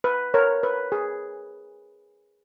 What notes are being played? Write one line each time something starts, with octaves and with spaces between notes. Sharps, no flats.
B4
A#4 C#5
B4
G#4